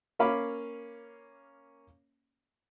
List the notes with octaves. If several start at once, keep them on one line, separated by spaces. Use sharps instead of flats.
A#3 C#4 F5 B5 D6